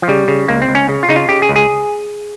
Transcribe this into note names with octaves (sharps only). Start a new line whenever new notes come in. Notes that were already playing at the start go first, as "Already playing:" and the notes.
F3
C#3 G3
C#3
C#2 A#3
C4
C#2
C#4
C#3
F4
C#3 D#4
F4
C#3 G4
G#4
C#2
G#4